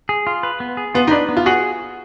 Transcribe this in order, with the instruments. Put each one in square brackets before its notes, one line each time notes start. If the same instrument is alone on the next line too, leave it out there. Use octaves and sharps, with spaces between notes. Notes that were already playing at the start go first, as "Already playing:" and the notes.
[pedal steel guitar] G#4
F4
B4
B3
G#4
[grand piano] B3 [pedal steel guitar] F4
[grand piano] D#4
[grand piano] D4 [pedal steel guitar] B4
[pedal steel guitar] B3
[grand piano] F4
[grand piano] F#4 [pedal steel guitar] G#4